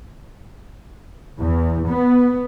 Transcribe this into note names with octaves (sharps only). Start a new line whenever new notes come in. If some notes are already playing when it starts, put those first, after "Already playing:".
E2
B3